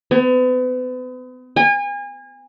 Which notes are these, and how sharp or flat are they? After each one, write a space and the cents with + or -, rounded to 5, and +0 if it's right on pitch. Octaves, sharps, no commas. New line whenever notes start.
B3 +40
G#5 -35